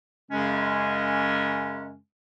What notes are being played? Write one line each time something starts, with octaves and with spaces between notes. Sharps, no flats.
F#2 C#3 G#3 C#4